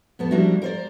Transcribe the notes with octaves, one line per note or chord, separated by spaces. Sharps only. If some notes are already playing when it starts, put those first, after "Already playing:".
F2 B3 A5
F3 G3 A#3 D4 E4 F#4
A#4 C5 D5